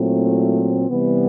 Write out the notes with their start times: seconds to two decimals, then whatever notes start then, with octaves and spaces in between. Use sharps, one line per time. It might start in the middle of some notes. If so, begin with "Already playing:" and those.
Already playing: A#2 F#3 A3 C4 E4
0.89 C3 E3 G3 B3